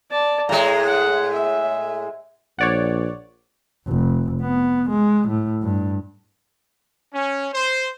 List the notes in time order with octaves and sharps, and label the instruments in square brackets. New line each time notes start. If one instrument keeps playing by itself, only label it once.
[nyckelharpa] D5 A5
[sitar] A2 G#3 [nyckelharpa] A#5
[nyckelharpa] F#5
E5
[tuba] A#1 [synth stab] C#5 D5 F#5
[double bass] F1
B3
G#3
A2
G2
[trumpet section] C#4
C5